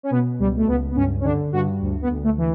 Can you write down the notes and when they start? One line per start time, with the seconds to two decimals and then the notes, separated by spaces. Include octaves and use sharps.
0.03 C#4
0.11 B2 B3
0.39 C#2 G3
0.57 A3
0.68 C#2 B3
0.91 B3
0.96 G2 C#4
1.20 C#4
1.24 D3 D4
1.52 G2 F#4
1.81 D2
2.02 B3
2.10 D2
2.23 A3
2.38 E3